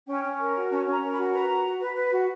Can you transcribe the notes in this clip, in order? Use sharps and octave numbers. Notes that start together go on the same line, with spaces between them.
C#4 G5
C#4
A#4
F#4
C#4 A5
C#4
A#5
A#4
B5
F#4
B4 A#5
F#4
F#4
B4
B4
F#4